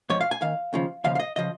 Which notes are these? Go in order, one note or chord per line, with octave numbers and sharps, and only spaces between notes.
G#2 F3 C#5
F5
G#5
D#2 D#3 F5
D#2 C#3 F3
D#2 C#3 F3 F5
F5
D#5
C#3 F3 D#5